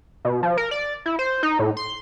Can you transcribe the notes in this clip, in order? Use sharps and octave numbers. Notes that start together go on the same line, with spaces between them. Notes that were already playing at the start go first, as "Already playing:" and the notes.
B2
F3
A#4
D5
E4
C5
D#4
A2
C6